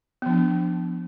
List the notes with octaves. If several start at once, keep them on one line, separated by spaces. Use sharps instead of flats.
F3 B3 D4